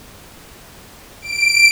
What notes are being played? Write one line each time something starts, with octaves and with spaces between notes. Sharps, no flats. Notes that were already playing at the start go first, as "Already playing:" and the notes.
D7